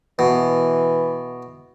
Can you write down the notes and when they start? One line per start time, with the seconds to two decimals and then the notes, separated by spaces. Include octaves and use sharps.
0.19 B2 E3